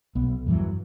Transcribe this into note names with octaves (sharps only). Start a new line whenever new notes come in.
B1 B3
E2 G2 E3 F#3